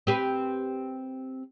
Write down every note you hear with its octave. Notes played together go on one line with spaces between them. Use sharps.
C4 G4 B4